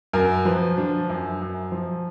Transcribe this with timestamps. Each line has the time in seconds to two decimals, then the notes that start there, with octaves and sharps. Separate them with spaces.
0.13 F#2 A#4
0.45 F3 B4
0.77 F3 D4
1.09 F#2
1.41 F#2
1.72 F3